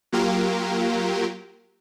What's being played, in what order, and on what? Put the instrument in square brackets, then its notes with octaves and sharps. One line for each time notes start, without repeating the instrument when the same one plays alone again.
[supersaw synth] F#3 A#3 F4 G4 A#4